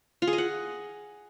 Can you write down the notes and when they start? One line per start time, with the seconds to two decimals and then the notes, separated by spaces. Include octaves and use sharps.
0.22 F4
0.27 G#4
0.33 D#5
0.38 F#5